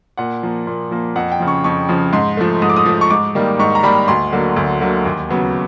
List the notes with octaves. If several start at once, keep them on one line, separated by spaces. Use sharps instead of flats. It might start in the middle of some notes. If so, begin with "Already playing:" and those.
A#2 F#5
F3 A#3
A#2
F3 A#3
F2 F#5
G5
C#3 F3
C#6
F2 C#6
C#3 F3
G#2 C6
F3 A3
G#2 D#6
D6
D#6
F3 A3
C#6
G#2 D6
D#3 G3 A#3
G#2 C#6
A#5
D#3 G3 A#3 B5
D2 C6
D3 F#3 A#3
D2
D3 F#3 A#3
D#2
C#3 F#3 B3